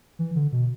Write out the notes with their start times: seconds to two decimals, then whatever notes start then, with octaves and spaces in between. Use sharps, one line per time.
0.19 E3
0.35 D3
0.52 B2